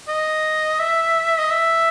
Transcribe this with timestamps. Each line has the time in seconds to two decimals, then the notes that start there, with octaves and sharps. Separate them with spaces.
0.08 D#5
0.80 E5
1.39 D#5
1.50 E5